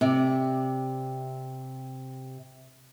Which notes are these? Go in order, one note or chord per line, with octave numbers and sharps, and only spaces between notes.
C3 D5